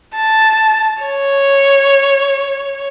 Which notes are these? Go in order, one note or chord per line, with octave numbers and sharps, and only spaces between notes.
A5
C#5